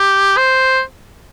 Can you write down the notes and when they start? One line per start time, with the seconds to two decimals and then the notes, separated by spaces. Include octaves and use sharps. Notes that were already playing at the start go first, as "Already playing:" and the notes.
Already playing: G4
0.37 C5